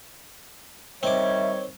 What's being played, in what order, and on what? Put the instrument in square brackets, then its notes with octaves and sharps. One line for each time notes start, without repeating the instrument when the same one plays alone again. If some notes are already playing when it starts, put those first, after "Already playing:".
[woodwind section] D#3 G3 C#5 [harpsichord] C4 D6 [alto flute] E5